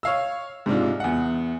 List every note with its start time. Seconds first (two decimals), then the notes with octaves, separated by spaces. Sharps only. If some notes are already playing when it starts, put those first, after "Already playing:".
0.03 C#5 F5 E6
0.66 G#2 C3 D4 F4
1.00 E2 F#5